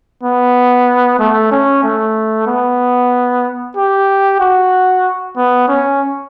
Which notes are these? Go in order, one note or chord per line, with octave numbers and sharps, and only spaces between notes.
B3
A3
C#4
A3
B3
G4
F#4
B3
C#4